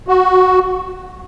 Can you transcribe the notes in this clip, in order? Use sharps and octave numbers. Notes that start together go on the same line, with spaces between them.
F#4